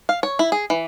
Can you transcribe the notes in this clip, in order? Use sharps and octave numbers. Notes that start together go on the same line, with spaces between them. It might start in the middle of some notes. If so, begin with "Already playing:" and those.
F5
C#5
E4
G#4
E3